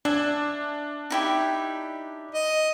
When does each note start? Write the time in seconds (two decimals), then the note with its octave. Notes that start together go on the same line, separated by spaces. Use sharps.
0.05 D4 E5 G#5
1.10 D#4 E4 G4
2.34 D#5